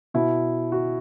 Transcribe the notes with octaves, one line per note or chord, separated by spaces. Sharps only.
B2 E4
F#4